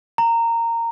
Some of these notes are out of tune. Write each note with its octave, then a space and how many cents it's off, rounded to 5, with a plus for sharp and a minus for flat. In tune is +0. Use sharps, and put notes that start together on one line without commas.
A#5 -15